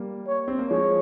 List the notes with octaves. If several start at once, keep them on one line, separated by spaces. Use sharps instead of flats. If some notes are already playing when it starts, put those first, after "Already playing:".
Already playing: G3 A#3
C#5
C4
A#3
F3 G#3 C#5